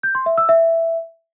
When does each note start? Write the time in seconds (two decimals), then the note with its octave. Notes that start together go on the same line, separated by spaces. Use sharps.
0.03 G6
0.15 C6
0.26 E5
0.38 E6
0.49 E5